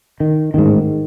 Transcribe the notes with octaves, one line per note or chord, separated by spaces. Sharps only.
D#3
A1 G#2 D#3